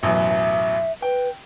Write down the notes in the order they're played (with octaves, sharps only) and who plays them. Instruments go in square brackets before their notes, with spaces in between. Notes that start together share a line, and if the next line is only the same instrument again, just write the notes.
[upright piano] A1 F#2 B2 [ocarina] E5
[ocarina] B4 [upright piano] G5